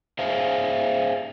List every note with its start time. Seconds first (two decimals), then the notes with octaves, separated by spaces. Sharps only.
0.19 G#4 C5 E5 F5